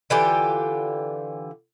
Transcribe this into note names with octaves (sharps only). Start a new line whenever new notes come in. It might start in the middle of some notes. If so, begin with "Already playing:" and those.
D3 E3 F4 G4